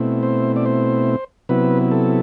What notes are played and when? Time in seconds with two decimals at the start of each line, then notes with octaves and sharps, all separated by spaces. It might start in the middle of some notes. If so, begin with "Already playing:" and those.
Already playing: B2 A3 C4 E4
0.23 C5
0.56 D5
0.66 C5
1.49 C3 F#3 B3 E4 B4
1.92 A4